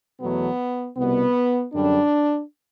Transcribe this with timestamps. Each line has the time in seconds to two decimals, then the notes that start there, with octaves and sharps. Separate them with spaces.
0.21 E2 B2 F#3 A3 B3
0.97 C2 B2 G3 B3
1.73 F#2 D3 G3 D4